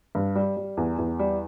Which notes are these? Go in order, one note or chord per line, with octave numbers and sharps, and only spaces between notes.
G2
G3
G3
E2
E2
G3